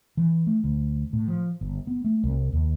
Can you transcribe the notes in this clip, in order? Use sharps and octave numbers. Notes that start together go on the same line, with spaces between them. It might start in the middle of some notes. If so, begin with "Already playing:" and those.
E3
A3
D2
A2
F3
G1
B3
A3
C2
D#2